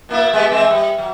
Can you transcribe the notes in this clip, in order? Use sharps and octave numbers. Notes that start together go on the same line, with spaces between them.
B2 A#3 E4
G#3 B3 G4
E3 G#3 C4
G3
F#3